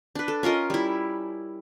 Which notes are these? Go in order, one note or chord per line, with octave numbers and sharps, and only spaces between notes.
D4 B4
A4
C#4 F4 A#4 D#5
G3 E4